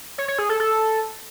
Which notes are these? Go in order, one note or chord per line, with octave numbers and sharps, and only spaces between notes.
C#5
C#5
G#4
A4
A4